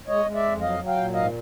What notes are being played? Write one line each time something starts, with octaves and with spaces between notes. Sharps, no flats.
G#3 C#5 D#5
G#3
D5 E5
F2
F#3 D#5 F5
F#3
F5 G5
A#2
G#2 D#5 F5